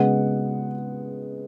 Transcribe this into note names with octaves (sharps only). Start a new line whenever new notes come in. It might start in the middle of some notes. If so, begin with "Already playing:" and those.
Already playing: C#3 G#3 B3 F#5